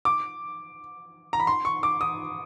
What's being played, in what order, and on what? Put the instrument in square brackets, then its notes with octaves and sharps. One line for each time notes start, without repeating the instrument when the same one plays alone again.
[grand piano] D6
A#5
B5
C6
C#6
D6
D#6